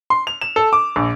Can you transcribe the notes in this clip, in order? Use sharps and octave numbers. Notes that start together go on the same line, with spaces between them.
C6
F7
E7
A4
D6
A#1